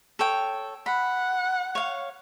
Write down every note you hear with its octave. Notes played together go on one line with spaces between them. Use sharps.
A4 C#5 G5
F#5 B5
C#5 F5